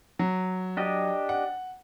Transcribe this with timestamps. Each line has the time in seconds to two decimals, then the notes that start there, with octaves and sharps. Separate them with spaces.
0.19 F#3
0.77 D4 G4 D#5
1.29 F#5